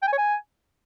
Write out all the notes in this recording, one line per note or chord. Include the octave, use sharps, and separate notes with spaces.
G5
G#5
C#5
G#5